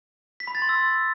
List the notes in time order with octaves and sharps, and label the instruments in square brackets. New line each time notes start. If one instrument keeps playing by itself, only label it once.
[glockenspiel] B6
B5
A6
C6
E6